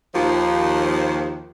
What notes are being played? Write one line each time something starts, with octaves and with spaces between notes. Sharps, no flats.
D#2 F3